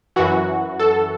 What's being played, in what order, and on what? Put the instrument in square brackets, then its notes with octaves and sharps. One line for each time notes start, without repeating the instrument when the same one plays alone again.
[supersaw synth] F#2 E3 F#4
A4